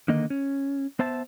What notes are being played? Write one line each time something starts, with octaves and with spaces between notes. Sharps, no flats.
D3 D#3 A#3 D#5
C#4
B3 C5 E5 A5